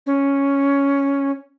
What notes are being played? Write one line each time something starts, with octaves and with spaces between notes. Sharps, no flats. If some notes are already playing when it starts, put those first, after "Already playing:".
C#4